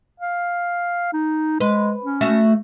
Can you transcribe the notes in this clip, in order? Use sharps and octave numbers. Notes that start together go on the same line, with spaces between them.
F5
D#4
G#3 B4
C#4
A3 F#4 E5